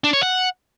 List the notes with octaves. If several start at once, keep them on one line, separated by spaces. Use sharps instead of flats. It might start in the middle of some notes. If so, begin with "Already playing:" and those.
D4
C#5
F#5